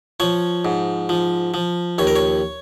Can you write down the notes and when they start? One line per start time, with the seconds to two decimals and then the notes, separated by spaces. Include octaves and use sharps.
0.20 F3 C#5
0.65 G#2
1.09 F3
1.54 F3
1.98 D#2 C#5
2.07 A#4
2.16 C#5